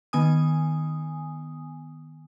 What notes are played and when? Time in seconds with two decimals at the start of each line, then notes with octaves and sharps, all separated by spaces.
0.13 D#3 B3 G#5 D#6